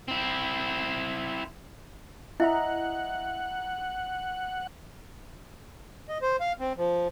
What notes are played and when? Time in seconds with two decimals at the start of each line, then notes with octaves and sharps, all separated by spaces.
0.08 C4 E4
2.40 E4 D#5 E5 F#5 A#5
6.09 D#5
6.22 C5
6.40 F5
6.60 C4
6.77 F3